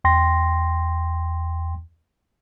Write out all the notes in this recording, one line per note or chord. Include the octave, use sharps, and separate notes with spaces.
E2 G5 C6 A#6